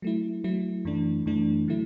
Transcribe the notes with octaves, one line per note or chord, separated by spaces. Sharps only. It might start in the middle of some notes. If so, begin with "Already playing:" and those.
F#3 A3 E4
F#3 A3 E4
F#2 E3 A3 D4
F#2 E3 A3 D4
D3 F#3 A3 E4